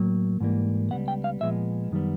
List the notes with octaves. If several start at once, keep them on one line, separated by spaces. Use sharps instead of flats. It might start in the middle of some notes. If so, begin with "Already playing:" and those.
Already playing: A2 F#3 A#3
G#2 E3 G3 A#3
C#2 B2 G3 B3 F#5
G5
F5
A#2 F3 G#3 B3 E5
F#2 D#3 G3 B3